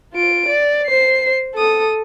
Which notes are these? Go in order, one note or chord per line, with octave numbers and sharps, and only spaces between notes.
F4 D7
D5
C5 C7
A4 D#6